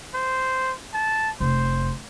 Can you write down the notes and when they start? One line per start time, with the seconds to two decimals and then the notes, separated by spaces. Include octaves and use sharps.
0.14 C5
0.94 A5
1.40 F1 C5